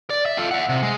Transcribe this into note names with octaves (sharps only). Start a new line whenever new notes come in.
D5
E5
F4 A4
E5 F#5
C3
G#3